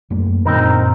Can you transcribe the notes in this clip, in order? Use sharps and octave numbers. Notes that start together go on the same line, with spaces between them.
F#2 A3 A#3
F#2 A#2 D3 C4 D#4 A#4